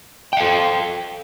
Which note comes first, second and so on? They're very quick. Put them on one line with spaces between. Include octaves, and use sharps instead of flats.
G5 F5 A4